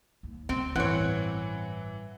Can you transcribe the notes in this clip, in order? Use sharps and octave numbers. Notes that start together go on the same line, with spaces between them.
D#2
D2 B2 C4
A1 G2 E3 C4 C#5 F#5 F#6